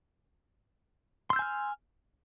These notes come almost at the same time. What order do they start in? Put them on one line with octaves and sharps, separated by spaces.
C6 E6 G6 G#5 F6